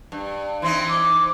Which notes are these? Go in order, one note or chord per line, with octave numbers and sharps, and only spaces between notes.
G2
E3 C4 D#4 C6
D6